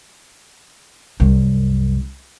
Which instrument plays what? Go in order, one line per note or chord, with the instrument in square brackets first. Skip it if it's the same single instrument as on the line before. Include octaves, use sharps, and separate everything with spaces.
[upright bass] C2 F#2